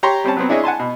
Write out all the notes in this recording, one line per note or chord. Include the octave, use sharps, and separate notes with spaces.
G4 C#5 A#5 C6 C#6
G3 C4 C#4 A5
F#3 B3 C4
D4 E4 G#4 C#5 D#5
F#5 G#5 A5 C6
B2